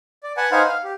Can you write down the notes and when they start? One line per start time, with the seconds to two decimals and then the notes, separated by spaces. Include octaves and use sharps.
0.23 D5
0.37 B4 F#5 G#5 A5
0.52 D#4 B4 C5 F5 F#5 G#5
0.68 F5
0.84 G4